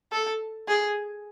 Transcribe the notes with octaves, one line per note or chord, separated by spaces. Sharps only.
A4
G#4